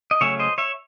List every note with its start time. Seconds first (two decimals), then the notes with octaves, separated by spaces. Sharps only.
0.11 D#5
0.21 C#3 F#3 A3 C#4 C#5 E5
0.39 C5 D#5
0.58 C#5 E5